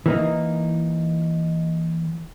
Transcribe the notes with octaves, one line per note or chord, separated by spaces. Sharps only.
E3 A#3 D#4